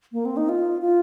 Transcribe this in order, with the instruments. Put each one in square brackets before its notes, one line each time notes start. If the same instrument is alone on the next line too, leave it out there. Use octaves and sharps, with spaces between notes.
[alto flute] A#3
C4
D#4
F4
F4